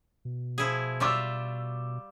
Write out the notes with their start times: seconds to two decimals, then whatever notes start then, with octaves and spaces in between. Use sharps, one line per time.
0.25 B2
0.58 F3 E4 G#4
1.00 G3 F4 E5 C#6 D6 E6